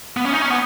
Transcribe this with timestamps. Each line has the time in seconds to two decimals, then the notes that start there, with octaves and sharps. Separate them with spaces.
0.17 B3
0.25 C#4
0.33 D#4
0.42 C#4
0.50 B3